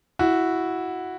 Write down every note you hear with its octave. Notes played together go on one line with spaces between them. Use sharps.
E4 F#4